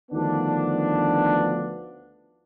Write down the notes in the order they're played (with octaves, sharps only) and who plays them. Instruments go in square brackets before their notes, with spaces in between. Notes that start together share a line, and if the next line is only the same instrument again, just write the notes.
[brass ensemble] D2 D#3 F3 B3 D4